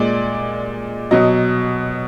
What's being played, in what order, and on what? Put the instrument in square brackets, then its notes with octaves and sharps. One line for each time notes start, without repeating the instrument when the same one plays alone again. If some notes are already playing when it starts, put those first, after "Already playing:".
Already playing: [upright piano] A#2 G#3 D5
B2 F#3 D#5